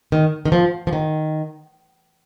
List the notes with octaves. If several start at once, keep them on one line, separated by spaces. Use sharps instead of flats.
D#3
D#3
F3
F3
D#3